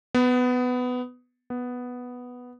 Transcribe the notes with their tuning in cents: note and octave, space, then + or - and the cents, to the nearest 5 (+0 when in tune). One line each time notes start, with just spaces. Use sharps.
B3 +15
B3 +0